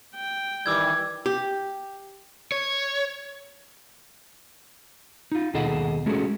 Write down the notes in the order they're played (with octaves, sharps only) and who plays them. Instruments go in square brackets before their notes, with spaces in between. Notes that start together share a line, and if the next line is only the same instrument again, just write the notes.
[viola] G5
[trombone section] D#3 E3 G3 [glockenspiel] D6 E6 G#6
[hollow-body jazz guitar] G4
[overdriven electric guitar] C#5
[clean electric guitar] D#4 F4
D#2 B2 G#4 A4 D#5 F#5
G#3 A3 C#4 F#4 G#4 A4